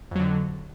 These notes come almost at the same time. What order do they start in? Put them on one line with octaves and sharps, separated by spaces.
F2 F#3 D3